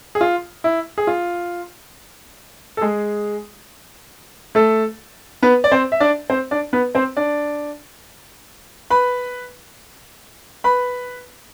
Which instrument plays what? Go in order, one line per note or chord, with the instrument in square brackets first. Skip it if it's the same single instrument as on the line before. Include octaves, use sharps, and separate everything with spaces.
[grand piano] G#4
F4
E4
G#4
F4
A4
G#3 G#4
A3 A4
B3 B4
D5
C4 C5
E5
D4 D5
C4 C5
D4 D5
B3 B4
C4 C5
D4 D5
B4 B5
B4 B5